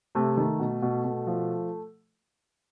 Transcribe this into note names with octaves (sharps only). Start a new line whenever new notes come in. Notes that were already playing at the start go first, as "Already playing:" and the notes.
C3 A3
D#3 A3
B2
B2
B2
F3